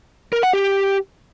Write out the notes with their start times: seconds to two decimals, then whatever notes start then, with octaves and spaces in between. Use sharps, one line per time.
0.33 A#4
0.43 F#5
0.53 G4